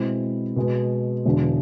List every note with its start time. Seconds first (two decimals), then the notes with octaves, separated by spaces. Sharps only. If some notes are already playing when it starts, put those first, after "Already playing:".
Already playing: B2 G#3 C4 E4
0.56 B2 G#3 B3
1.25 E1 E2 D3